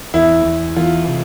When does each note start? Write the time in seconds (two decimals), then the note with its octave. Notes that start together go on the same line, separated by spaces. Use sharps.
0.14 E2 E4
0.45 E2
0.77 E3 F4
1.08 C3